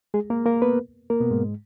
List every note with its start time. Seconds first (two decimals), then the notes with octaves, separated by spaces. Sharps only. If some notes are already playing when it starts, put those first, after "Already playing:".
0.14 G#3 G#4
0.30 A#3 A#4
0.46 A#3 A#4
0.62 B3 B4
1.10 A#3 A#4
1.20 B2 B3
1.31 G#2 G#3